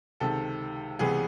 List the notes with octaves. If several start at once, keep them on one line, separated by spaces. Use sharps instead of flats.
C#2 C3 D#3 A4
C#2 C3 E3 G3 B3 G#4